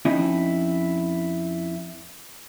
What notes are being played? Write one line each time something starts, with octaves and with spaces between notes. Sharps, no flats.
F2 C#4 D#4 E4 D#5